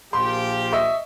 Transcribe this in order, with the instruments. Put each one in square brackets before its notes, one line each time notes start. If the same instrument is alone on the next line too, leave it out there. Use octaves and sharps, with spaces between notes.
[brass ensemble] A#1 F3 G4 [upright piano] C6
[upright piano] D#5 E5 C#6